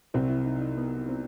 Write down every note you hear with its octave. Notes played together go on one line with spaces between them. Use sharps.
C2 C3 F#3 C4 F#4
E4
D#4
D#4
B3
C4